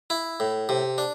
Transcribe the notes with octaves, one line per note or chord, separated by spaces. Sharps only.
E4
A2
C3
D4